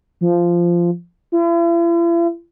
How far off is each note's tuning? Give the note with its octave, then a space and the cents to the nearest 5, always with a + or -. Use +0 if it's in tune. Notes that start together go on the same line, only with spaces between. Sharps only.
F3 -10
E4 +45